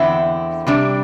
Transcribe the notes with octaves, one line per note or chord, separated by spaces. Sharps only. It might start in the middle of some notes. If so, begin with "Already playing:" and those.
Already playing: E2 D3 C4 E4
C3 G3 D4